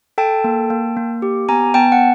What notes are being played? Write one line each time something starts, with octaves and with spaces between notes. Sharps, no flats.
A4 G5 A5
A#3
A#3
A#3
G4
B3 G#5 A#5
B3 G5 A5
F#5